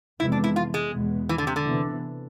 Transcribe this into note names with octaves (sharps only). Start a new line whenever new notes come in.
F2 C3 E3 G#3 B3 E4
D4
E4
F4
G#3
E2 B2 G#3 B3
E3
D3
C3
D3
C3 E3 B3